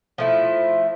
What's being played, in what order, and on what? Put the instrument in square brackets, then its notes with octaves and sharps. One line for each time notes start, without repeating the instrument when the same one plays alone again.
[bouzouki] F3 A3 E4